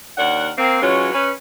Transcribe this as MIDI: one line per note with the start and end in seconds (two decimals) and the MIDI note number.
0.18 0.51 39
0.18 0.51 62
0.18 0.51 70
0.18 0.51 78
0.58 0.81 58
0.58 0.81 60
0.82 1.13 52
0.82 1.13 54
0.82 1.13 56
0.82 1.13 61
0.82 1.13 65
1.14 1.31 61
1.14 1.31 71